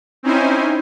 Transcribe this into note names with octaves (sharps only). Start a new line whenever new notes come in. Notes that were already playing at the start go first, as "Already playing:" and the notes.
C4 C#4 D#4 E4 C5 G#5